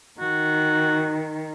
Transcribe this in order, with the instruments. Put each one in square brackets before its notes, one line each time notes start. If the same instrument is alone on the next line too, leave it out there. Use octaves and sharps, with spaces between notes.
[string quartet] D#3 [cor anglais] F#4